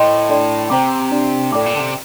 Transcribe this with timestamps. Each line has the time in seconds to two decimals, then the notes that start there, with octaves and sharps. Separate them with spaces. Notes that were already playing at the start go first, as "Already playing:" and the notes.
Already playing: A2 C5 D#5 G5 C6
0.29 D4 A4 D5 G5 C6
0.70 C3 C5 G5 A#5 D6
1.11 D4 G4 D5
1.52 A2 A4 D5 G5 D6
1.66 A#2
1.75 D3
1.79 C3